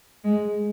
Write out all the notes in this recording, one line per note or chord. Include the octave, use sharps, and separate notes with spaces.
G#3